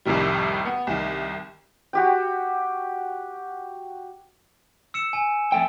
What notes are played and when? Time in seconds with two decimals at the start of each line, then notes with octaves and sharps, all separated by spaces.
0.05 C2 F2 A2 C3 D#3 G3
0.65 B3
0.87 C2 D#3
1.93 F#4 G4 G5
4.94 E6 C#7 E7
5.13 G#5
5.52 F2 A3 G5